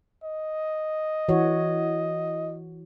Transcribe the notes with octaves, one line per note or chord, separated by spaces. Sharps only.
D#5
E3 F#4 C#5